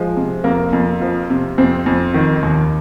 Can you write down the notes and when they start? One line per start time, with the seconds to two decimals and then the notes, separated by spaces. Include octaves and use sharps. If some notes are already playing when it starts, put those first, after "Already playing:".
Already playing: F3 G#3
0.17 C3
0.44 F2 A#3
0.73 F2
1.01 F3
1.30 C3
1.58 F2 C4
1.86 F2
2.14 D#3
2.43 D#2